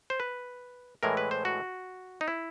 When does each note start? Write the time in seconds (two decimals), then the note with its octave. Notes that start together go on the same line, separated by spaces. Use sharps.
0.10 C5
0.20 B4
1.03 A2 E3 G#3 A#4
1.17 B4
1.31 C5
1.45 F#4
2.21 D#4
2.28 E4